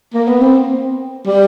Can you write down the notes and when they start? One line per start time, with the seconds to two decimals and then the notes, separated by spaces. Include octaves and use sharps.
0.14 A#3
0.28 B3
0.42 C4
1.27 G3